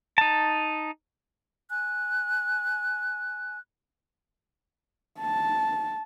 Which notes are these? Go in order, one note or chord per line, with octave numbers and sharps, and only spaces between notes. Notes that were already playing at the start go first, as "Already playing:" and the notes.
D#4 A5
G#5 F#6
A5